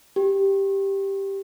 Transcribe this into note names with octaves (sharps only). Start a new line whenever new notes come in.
G4